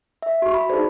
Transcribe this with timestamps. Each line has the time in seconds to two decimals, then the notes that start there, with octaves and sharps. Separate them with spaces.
0.22 E5
0.42 F#4 C#6
0.54 B5
0.70 D#4 G#4 C5 D5